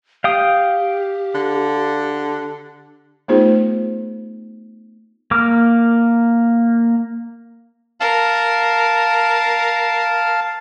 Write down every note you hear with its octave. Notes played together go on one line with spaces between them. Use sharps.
G4 F5 G5 D#6
D3
A3 B3 D#4 F4 G#4 C5
A#3 D6 F6
A#4 F5 A5